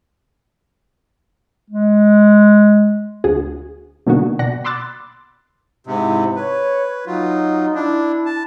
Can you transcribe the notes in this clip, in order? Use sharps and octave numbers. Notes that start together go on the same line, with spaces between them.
G#3
D2 F#4 G#4
B2 D3 G3 A#3 D#4 F#4
B2 D5 F#5 A#6
B5 C6 D6 E6 F#6 A6
G#2 C3 E4
B4 C#5
F#3 D#4 F4
D4 E4
A5